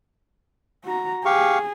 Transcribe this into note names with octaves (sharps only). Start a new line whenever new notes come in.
F#4 A#5
G4 G#4 F5 C#6